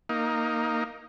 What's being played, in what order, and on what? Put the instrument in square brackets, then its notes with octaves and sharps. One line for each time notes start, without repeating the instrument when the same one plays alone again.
[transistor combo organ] A#3 D#4